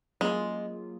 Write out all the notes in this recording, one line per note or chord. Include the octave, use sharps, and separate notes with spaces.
F#3 G#3 A#3 C#4 F4 G#4